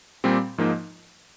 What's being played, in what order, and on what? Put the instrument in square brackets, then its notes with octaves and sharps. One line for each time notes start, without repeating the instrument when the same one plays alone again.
[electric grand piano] A#2 G3 C4 G4
G#2 F3 A#3 D#4